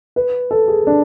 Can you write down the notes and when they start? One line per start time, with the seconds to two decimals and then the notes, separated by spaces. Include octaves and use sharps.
0.16 B4
0.51 A4
0.68 G#4
0.87 D4